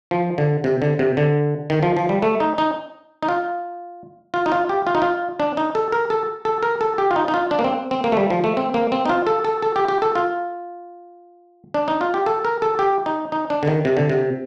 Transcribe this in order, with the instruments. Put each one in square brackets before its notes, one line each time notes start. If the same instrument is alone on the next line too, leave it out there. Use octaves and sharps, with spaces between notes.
[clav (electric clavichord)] F3
D3
C3
D3
C3
D3
D#3
F3
F3
G3
A3
D#4
D#4
D#4
F4
F4
D#4
F4
G4
F4
D#4
F4
D4
D#4
A4
A#4
A4
A4
A#4
A4
G4
F4
D#4
D#4
F4
D4
A#3
C4
C4
A#3
A3
G3
F3
A3
C4
A#3
C4
D#4
F4
A4
A4
A4
G4
G4
A4
F4
D4
D#4
F4
G4
A4
A#4
A4
G4
D#4
D#4
D4
D3
D#3
C3
D3
C3